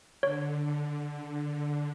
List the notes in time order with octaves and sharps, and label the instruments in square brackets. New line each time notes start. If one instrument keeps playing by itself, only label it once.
[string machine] D3 [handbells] C#5